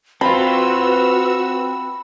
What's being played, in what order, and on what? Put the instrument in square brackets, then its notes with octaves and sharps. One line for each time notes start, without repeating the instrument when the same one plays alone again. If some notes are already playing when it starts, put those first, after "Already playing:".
[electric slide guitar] C4 F4 [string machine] F#4 E6 [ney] B4 [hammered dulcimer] B5